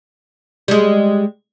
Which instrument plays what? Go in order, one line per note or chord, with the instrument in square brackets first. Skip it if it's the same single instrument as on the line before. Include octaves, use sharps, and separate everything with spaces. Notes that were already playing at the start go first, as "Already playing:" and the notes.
[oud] G3 G#3